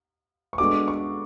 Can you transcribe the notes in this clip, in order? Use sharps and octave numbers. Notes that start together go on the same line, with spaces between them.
C#6
G#3 B3 D4 F#4 A4 D6
C#6